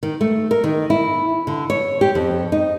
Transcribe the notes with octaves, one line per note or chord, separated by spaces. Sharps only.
D#3
A3
A#4
D#3
E4
D3
C#5
G4
F2
D#4